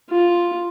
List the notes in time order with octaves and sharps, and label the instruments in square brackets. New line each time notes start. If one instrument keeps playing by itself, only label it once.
[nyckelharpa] F4